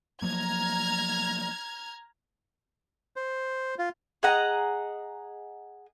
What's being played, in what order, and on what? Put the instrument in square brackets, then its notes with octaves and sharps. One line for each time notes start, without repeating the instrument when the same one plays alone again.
[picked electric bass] F3 F#3 A#3 [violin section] A#5 F6 G#6
[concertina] C5
F4
[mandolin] G#4 D#5 F#5 A#5